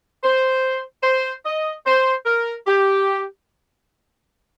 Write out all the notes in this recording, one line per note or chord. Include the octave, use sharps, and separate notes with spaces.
C5
C5
D#5
C5
A#4
G4